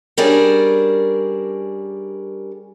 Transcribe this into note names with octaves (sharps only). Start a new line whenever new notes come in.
G3 C#4 D4 G#4 A#4 D5